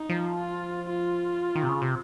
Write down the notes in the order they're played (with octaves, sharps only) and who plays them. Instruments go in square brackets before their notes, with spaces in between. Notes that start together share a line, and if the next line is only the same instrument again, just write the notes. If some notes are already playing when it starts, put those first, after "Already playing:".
Already playing: [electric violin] D#4
[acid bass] F3
[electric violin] F4
F4
[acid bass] D#3
C3
C#3
C3